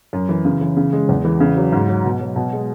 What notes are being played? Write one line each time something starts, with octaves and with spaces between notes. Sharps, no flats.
F#2
E3
C#3
E3
C#3
G#3
E2
E3
C#3
F#3
G#2
F#3
B2
F#3
B2
G#3